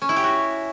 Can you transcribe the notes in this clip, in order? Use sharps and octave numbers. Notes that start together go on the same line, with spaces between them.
C#4
E4
G4
F#4